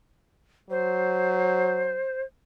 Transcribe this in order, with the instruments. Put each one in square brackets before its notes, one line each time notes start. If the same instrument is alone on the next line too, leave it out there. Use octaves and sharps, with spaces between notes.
[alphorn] F#3 [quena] C5